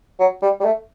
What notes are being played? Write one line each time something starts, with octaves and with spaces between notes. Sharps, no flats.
F#3
G3
G3
A3